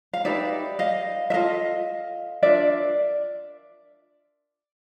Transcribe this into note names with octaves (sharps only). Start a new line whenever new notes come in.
F5
D#4 G4 B4 D5 E5
D#5 F5
E5
F4 A4 D#5 F5
D4 F4 A#4 D5 E5